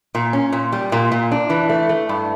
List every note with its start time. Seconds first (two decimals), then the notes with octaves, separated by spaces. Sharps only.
0.15 A#2
0.33 C#4
0.52 A#2
0.72 G3
0.92 A#2
1.12 A#2
1.31 D4
1.50 E3
1.69 A3
1.89 A3
2.09 G2